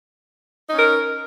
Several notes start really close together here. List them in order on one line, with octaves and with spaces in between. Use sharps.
D#4 C#4 A#4